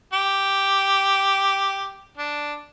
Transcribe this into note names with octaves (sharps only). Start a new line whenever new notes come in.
G4
D4